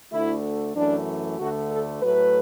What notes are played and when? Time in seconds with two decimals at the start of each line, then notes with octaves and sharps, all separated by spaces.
0.12 D2 D3 A3 E4
0.76 F#2 E3 A3 D4
1.39 D2 D3 A3 F#4
1.71 A4
2.03 A2 F#3 A3 B4